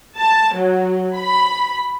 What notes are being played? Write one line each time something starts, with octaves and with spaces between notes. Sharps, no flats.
A5
F#3
B5